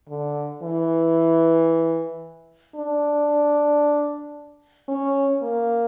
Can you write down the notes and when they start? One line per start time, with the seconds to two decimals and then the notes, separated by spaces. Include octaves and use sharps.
0.09 D3
0.63 E3
2.76 D4
4.89 C#4
5.42 A#3